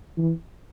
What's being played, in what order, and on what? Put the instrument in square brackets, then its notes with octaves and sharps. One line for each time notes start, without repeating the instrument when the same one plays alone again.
[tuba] E3